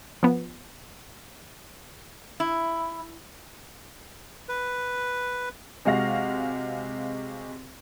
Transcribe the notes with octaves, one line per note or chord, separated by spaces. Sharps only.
F3 B3
E4
B4
C3 G#3 F#4 F5 A#6